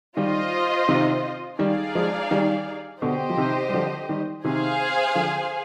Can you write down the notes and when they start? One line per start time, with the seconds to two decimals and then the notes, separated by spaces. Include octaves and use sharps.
0.17 D#3 G3 F4 C5 D#5
0.89 C3 D#3
1.59 D#3 G3 D#4 G#4 D5 F5
1.95 F3 G#3
2.31 D#3 G3
3.02 B2 D3 G4 C5 D#5
3.29 F3
3.37 C3 D#3
3.69 G3
3.73 D3 F3
4.09 D#3 G3
4.44 C3 D#3 G#4 C5 F5 G#5
5.15 D3 F3